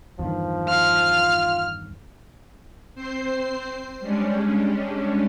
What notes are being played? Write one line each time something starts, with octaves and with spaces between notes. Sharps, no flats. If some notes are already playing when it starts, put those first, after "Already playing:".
E2 G2 D#3 F3
F4 F6
C4 C5 C7
G3 G#3 C#4 D4